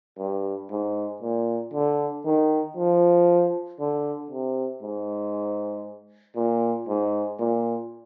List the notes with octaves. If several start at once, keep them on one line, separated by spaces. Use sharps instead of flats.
G2
G#2
A#2
D3
D#3
F3
D3
C3
G#2
A#2
G#2
A#2